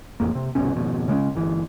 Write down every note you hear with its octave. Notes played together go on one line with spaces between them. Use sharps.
A1 F2 A#3
C3
G1 C2 B2 C#4
G#1 F2 B2
C#3 G#3 B3 C#4
G1 E3